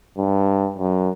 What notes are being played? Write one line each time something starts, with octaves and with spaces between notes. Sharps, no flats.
G2
F#2